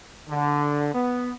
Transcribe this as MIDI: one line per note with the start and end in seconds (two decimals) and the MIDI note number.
0.30 0.91 50
0.95 1.33 59